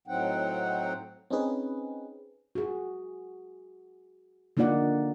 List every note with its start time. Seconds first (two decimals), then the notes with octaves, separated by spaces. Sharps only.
0.07 A2 F#3 C4 D#4 F#5 G5
1.30 C4 C#4 D#4 G#4 B4
2.55 F#4 G#4
4.57 D3 A#3 D#4 F4 D5 F#5